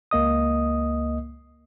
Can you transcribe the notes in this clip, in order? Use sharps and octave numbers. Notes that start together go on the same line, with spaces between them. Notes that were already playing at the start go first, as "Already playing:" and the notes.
C#2 A#3 D#5 D#6